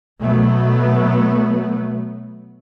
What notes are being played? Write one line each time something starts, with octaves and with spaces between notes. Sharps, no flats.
B2 F#3 A3 B3